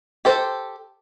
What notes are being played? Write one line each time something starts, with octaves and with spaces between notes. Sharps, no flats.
G4 A4 C5